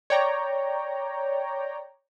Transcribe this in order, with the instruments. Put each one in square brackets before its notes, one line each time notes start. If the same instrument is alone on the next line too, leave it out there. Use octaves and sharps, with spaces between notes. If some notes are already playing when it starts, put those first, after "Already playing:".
[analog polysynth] C#5 D5 G5 A#5